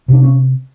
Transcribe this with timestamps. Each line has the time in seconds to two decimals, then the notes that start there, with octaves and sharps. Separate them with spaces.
0.08 C3 D4
0.23 C#4